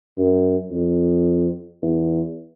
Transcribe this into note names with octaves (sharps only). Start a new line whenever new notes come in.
F#2
F2
E2